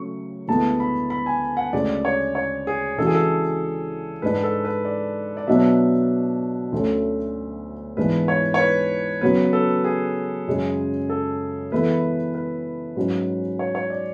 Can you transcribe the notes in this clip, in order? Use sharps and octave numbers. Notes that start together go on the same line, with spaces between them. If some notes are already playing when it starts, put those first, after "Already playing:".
Already playing: C#3 F#3 A3 C#6
D2 D3 G#3 B3 E4 A5
B5
B5
G#5
F#5
D2 C#3 G#3 D5
C#5
C#5
G#4
C#3 E3 G#3 D4 F#4 A4
G#4
A4
G#2 G#3 D4 B4
A4
B4
D5
D5
B2 F#3 B3 D4 E5
D2 D3 A3 C#4
G#2 E3 G#3 B3 D4 B4
C#5
C#5
B4
C#3 F#3 B3 B4
A4
G#4
F#2 C#3 G#3
A4
E3 G#3 B3 E4 A4 B4
B4
G#2 F#3 C#4
C#5
C#5
D5